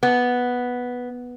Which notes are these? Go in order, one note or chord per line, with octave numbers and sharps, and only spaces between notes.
B3